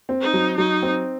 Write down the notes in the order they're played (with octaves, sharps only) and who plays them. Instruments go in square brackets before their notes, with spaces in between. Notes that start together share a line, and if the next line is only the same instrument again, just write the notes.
[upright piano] C4
[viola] D#4
[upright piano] F#3
[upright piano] F#3 [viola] D#4
[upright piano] C4